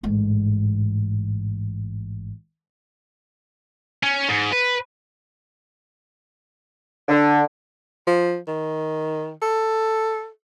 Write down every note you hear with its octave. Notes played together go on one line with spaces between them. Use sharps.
A1 G#2
C#4
G#2
B4
D3
F3
D#3
A4